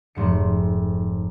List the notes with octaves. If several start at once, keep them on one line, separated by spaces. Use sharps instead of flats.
F1 G#2 C#7